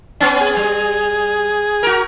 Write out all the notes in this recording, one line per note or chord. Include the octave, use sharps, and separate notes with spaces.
B3 C#4
G#4
G3
F#4 A#4